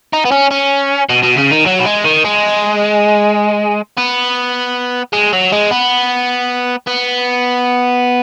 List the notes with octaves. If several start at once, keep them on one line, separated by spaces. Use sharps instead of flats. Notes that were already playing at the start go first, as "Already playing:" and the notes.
D#4
B3
C#4
C#4
B2
B2
C#3
D#3
F#3
B3
G#3
D#3
G#3
B3
G#3
F#3
G#3
B3
B3